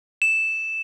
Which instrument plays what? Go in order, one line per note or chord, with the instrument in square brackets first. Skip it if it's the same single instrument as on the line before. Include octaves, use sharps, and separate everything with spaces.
[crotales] E7